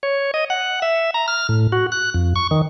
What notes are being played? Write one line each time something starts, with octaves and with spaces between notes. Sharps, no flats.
C#5
D#5
F#5
E5
A#5
F6
A2
F#4
F#6
F2
C#6
D#3